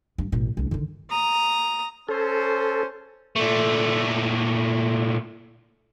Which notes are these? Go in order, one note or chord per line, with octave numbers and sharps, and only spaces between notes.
G2
A1 B2
C2 D4
D3 D#3
A#5 D#6
C#4 A4 C5
A#2 A3